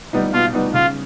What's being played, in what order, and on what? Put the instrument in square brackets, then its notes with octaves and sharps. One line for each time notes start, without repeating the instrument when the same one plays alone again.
[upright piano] G3 B3 D#4
[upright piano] B2 [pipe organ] F4
[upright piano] G3 B3 D#4
[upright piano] C#3 [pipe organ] F4